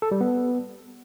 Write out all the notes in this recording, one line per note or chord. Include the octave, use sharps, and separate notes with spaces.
A4
G3
B3